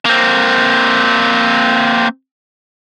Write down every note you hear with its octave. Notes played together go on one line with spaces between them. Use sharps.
A#3 C4